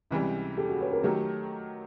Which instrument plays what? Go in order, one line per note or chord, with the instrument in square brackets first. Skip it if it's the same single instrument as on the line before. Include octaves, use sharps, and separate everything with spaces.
[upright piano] C#2 C3 E3 G3
[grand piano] G4 A4
F#4 G#4
B4 C#5
G#4 A#4
[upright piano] D#3 F#3 A3 [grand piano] G4 A4